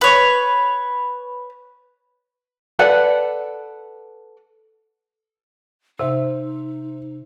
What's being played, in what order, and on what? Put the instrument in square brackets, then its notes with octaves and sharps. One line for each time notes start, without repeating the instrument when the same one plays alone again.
[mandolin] B4 C#5
[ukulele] A4 B4 D5 F#5
[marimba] C3 [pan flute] D#4 [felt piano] C5 E5